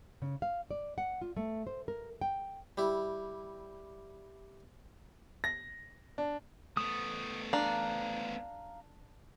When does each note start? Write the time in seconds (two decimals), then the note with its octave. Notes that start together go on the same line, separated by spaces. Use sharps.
0.22 C#3
0.42 F5
0.71 D5
0.98 F#5
1.21 F4
1.36 A3
1.67 C5
1.88 A#4
2.21 G5
2.78 G3 E4
5.44 A#6
6.18 D4
6.77 A3 B3 D#6
7.53 D4 F5 A#5